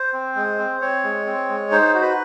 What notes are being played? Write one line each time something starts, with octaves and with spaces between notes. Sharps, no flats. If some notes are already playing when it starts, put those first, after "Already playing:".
Already playing: C5
C4
G#3
C4
C4 C#5
G#3
C4
G#3
D#4 C5
F#4
B4